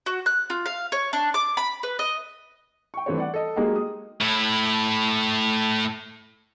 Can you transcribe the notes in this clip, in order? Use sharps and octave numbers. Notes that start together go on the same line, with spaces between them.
F#4
F#6
F4
F5
C#5
D4
D6
B5
B4
D#5
G5 C#6
E3 G3 A3 C4 G4 C#5
D5 F#5
A4 D#5
F#3 G#3 A#3 D#4 G4 G#4
D#6
A2 E4